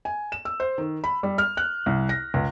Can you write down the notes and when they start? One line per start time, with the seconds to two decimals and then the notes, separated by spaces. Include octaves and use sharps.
0.05 G#5
0.32 E7
0.45 E6
0.60 C5
0.78 D#3
1.04 B5
1.23 G3
1.38 F6
1.57 F#6
1.86 C2
2.09 A#6
2.34 C#2